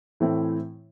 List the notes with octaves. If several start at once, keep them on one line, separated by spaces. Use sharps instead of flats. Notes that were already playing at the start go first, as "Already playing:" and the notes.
A2 E3 A3 C4 E4